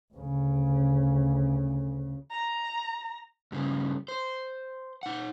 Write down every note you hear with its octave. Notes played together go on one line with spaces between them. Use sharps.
D2 C#3
A#5
G2 C#3
C5
D#4 F#5